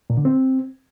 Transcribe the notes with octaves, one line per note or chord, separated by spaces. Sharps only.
A#2
D3
C4